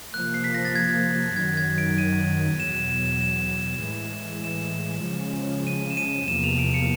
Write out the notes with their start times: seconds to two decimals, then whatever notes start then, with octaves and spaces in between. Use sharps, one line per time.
0.13 C3 F3 A#3 F#6
0.34 C7
0.44 B6
0.55 A#6
0.65 A6
0.75 G#6
1.36 F#2 D#3 F#3 G#6
1.57 G#6
1.78 D7
1.98 D#7
2.60 E2 B2 F#3 E7
2.75 E7
2.90 E7
3.06 E7
3.21 E7
3.82 A2 E3 G#3 E7
4.44 E7
5.06 C#3 F3 G#3 C#4
5.67 D#7
5.90 E7
5.97 D#7
6.28 E2 C3 F3 A#3 E7
6.44 F7
6.59 D7
6.74 C#7